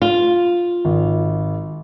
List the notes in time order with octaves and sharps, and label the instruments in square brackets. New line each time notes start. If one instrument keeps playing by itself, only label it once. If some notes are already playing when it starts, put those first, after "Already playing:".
[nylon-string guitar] F4
[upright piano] G#1